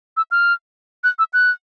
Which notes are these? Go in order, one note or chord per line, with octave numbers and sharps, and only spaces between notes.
E6
F6
F#6
E6
F#6